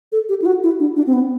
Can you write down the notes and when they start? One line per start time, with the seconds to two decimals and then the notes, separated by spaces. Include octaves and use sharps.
0.12 A4
0.29 G4
0.42 E4
0.46 F#4
0.63 E4
0.80 D4
0.97 D4
1.07 C4
1.13 B3